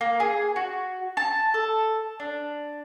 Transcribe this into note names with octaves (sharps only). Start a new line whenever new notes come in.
A#3
G#4
F#4
A5
A4
D4